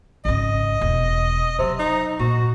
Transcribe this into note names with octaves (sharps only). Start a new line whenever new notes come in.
G#1 C#3 D#5
E1
C3 F#3
D#4
A#2 F#4